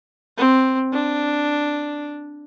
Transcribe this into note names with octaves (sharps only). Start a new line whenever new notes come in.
C4
D4